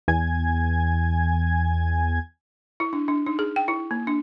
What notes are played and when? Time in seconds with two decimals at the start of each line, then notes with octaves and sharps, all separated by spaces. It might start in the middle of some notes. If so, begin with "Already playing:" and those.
0.08 E2 G#5 G#6
2.80 E4
2.93 D4
3.08 D4
3.27 D#4
3.39 G#4
3.56 G5
3.68 E4
3.91 A#3
4.07 D4